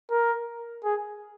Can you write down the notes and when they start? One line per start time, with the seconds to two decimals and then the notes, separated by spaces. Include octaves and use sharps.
0.10 A#4
0.84 G#4